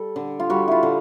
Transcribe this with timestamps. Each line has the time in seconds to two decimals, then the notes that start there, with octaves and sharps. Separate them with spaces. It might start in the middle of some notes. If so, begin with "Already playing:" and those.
Already playing: G3 A4
0.16 D3
0.40 F4
0.50 G3 F#4
0.68 E4 F4
0.83 D3